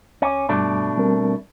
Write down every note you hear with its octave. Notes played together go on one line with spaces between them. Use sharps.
C#2 C#4 D6
G2 B2 G3 A3 D4 D6
G3 C4 A#4